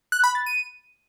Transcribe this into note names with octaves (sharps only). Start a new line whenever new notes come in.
F#6
B5
A6
D#7